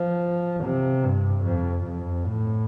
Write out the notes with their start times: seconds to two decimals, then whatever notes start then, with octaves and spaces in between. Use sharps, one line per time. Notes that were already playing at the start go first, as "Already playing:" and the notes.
Already playing: F3
0.64 C3
1.03 G2
1.44 F2
1.85 F2
2.25 A2